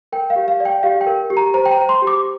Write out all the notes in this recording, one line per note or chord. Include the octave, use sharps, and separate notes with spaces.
A#4 G5
F5
G4
F5
D5
G5
G4 F5
G5
A#4
G4
A#5
C5 A#5
G5
A#5
C5
C6
G4
D6